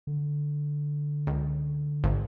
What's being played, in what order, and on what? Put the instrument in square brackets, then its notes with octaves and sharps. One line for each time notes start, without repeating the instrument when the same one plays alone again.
[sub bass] D3
[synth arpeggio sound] C#2
G#1